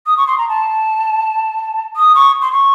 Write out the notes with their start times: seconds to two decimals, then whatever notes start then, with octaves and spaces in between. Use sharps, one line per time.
0.06 D#6
0.17 C#6
0.27 C6
0.38 A#5
0.48 A5
1.96 D#6
2.15 C#6
2.42 C6
2.52 C#6